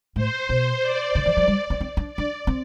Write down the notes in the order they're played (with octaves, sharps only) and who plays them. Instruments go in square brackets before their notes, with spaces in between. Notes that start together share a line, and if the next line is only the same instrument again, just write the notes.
[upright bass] A2 [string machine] C5
[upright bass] B2
[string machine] D5
[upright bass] D3
E3
F#3
G3
C4
C4
D4
[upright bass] D4 [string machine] D5
[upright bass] C4